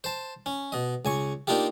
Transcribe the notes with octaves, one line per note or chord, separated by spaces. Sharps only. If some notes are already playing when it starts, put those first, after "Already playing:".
C5 A5
C#4
B2 D#5
C#2 G#5 C#6
A#3 D4 D#4 F4 G4